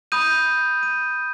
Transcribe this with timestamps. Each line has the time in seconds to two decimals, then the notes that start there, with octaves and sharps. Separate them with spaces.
0.12 B5 D#6 G6 D#7
0.83 D#7